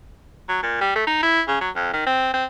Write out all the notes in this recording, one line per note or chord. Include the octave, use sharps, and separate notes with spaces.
F#3
A#2
G3
A3
D#4
E4
C#3
F#3
F2
D#3
C4
C4